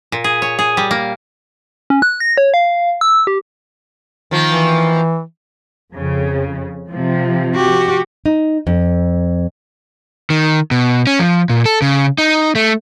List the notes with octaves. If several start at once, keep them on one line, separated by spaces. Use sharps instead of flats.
A#2
G#4
C#5
G#4
G3
A#3
C#4
F#6
A#6
C#5
F5
E6
G4
D#3 F3 A#3
E3
F2 C#3
C3 F3
F#4 G4
D#4
F2
D#3
B2
C#4
F3
A#2
A4
C#3
D#4
A3